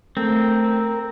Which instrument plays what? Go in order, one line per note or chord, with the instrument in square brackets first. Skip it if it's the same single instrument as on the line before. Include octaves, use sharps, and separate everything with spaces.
[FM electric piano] A3 [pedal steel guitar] C4 [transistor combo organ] A#4